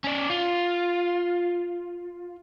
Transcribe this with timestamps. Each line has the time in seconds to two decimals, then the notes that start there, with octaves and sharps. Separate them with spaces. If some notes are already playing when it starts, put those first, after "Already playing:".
0.04 C#4 D5
0.30 F4